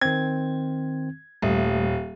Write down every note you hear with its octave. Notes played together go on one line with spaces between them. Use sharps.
D#3 C4 G#6
D#1 G3 A3 D#6